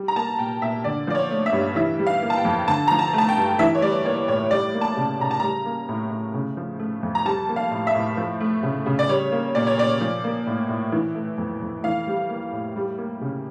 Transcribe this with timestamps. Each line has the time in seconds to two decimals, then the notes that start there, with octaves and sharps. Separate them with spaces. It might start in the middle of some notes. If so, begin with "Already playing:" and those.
Already playing: G3
0.08 A#5
0.16 A#3 A5
0.39 A#2 G5
0.62 A#2 E5
0.84 D3 D5
1.07 F3 D5
1.15 C#5
1.31 A3
1.46 E5
1.53 G2
1.76 E3 E5
1.99 G3
2.07 F5
2.23 A#3
2.30 A5
2.37 G5
2.45 F2
2.68 D3 A5
2.88 F3 A#5
2.99 A5
3.13 A3 A5
3.29 G5
3.37 G2
3.59 E3 E5
3.75 C#5
3.82 G3 D5
4.05 A#3 C#5
4.28 A2 C#5
4.51 G3 D5
4.74 A#3
4.81 A5
4.97 C#3
5.20 C#3 A#5
5.31 A5
5.40 G3 A#5
5.66 A#3
5.89 A2
6.11 A2
6.34 C#3
6.57 F3
6.79 A3
7.03 F2
7.15 A#5
7.25 G3 A5
7.49 A#3
7.56 F5
7.71 A2
7.87 E5
7.95 A2
8.17 F3
8.40 A3
8.63 C#3
8.86 C#3
8.99 D5
9.09 G3 C#5
9.32 A#3
9.55 A#2 D5
9.67 C#5
9.78 A#2 D5
10.01 F3
10.24 A#3
10.46 A2
10.69 A2
10.92 E3
11.15 A3
11.38 F2
11.61 F2
11.84 E3 F5
12.07 G3
12.29 A#3
12.52 A2
12.76 G3
12.98 A#3
13.21 C#3